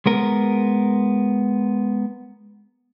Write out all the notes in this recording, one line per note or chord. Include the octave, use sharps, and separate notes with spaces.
G#3 B3 A#4